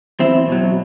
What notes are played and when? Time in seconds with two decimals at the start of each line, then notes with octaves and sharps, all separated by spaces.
0.20 E2 C4 E4
0.48 B2 F#3